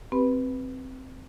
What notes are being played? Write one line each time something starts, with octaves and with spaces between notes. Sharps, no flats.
C4 G4 B4 B5